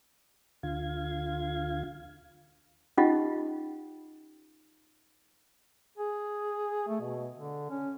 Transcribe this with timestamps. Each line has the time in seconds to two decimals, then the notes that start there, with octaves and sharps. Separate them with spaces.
0.63 D2 D3 F4 F5 G#6
2.97 C#4 D#4 F4 G4 D#5 F#5
5.98 G#4
6.88 A3
7.01 B2
7.34 D3
7.70 C#4